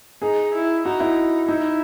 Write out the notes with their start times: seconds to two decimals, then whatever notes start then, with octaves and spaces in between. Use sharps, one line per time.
0.22 D#4 G#4
0.54 E4
0.85 D#4 F#4
1.00 E4
1.48 D#4 E4